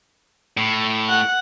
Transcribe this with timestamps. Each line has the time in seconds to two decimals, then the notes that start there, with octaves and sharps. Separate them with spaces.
0.57 A2
1.09 F#5